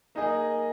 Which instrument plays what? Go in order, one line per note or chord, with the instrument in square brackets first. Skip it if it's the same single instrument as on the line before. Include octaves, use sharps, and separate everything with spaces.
[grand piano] A#3 D#4 G#4 D#5